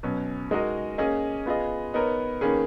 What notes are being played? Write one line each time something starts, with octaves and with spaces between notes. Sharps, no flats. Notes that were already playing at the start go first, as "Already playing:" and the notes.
B2 F#3 C#4
G#3 D#4 F#4 A#4 D#5
A#3 C#4 G#4 D#5
B3 F4 G#4 D#5
B3 D#4 A#4 C#5
D#3 A#3 C#4 G#4 B4